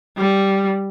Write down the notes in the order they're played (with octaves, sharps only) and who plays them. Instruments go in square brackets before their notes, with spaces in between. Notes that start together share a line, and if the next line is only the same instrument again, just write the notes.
[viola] G3